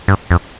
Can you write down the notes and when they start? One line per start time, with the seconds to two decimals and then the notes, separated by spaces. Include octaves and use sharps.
0.08 G2
0.31 F2